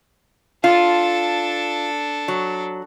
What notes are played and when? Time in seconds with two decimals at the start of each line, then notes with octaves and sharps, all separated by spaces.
0.64 D4 F4 A4
2.28 F#3